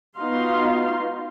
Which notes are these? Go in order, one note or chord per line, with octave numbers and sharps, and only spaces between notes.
B3 D#4 F4 F#4 F5 C6